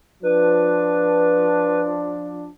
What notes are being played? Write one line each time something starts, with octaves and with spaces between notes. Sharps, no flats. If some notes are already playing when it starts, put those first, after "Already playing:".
F3 D4 B4